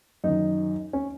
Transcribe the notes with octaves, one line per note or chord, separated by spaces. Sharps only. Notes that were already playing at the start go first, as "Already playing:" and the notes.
F#2 D#3 D#4
C#4